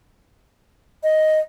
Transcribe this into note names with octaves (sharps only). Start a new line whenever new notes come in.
D#5